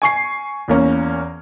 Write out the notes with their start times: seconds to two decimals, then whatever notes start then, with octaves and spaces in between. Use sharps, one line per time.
0.02 G#5 C#6 C7
0.68 E2 A#3 C#4